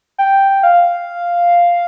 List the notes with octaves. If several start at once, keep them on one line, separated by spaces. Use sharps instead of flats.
G5
F5